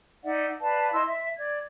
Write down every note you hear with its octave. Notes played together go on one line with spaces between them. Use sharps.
D#4 D5 E5 F#5
B4 D5 F5 A5
E4 D#5 C6 E6
E5
D5 G#6